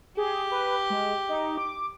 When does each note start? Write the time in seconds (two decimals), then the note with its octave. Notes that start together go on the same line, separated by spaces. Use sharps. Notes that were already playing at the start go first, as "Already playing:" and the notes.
0.17 G4 G#4
0.51 B4
0.90 G#3
1.29 D#4
1.58 D6